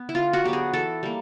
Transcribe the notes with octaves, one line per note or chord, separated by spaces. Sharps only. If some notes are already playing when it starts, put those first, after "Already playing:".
Already playing: B3
E4
D3 F4
F#4
F#3 B3 G4
G#4
E3 A4
G3 A#3